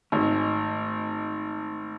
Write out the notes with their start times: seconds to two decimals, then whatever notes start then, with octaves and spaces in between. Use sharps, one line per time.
0.12 G#1 A3 D#5